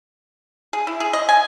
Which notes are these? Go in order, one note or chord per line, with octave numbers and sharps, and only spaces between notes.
G#4
E4
G#4
D#5
G#5